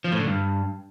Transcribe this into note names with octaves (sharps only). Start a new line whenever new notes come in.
F3
A2
D3
G2